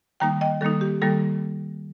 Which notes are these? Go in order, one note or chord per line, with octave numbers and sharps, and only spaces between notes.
D#3 G3 A#3 D#4 G5 A#5
D#5 G5
D#3 G3 A#3 D#4 A4
G4
D#3 G3 A#3 D#4 A4